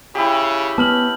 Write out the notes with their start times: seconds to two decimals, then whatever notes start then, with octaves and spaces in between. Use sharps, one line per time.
0.15 C#3 E4 G4
0.78 B3 C#4 A5 F6 F#7